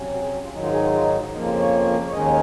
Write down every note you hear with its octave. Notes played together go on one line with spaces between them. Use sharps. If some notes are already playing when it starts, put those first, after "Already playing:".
Already playing: C3 F#3 C#4
F#4
G#4
F#4
F4
G#2 D#3 F#3 D#4
F4
G#4
F4
F4
D#4
D#4
F2 C#3 F3 A#3 D#4
F4
C5
C#5
C#5
D#2 D#3 G#3 C#4 D#5